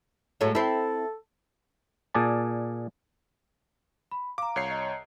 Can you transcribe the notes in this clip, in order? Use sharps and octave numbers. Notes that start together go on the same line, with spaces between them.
A2 F#3 G#3 A3
C4 E4 A4
A#2 G#4 D5 A5
B5
F5 A#5 D6
C2 C#5 C7
D#5 A#5